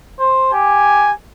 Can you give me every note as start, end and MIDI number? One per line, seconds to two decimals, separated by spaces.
0.19 0.51 72
0.53 1.11 67
0.53 1.12 80